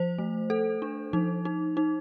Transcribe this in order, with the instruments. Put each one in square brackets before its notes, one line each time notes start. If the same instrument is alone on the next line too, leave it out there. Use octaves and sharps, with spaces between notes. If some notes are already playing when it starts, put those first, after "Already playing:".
Already playing: [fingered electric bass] F3 [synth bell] C5
[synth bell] A3
A4
D4
[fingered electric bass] F3 [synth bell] D#4
[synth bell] D#4
D#4